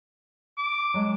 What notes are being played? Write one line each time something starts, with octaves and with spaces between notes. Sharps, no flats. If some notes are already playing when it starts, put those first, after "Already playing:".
D6
F#3 G#3 A5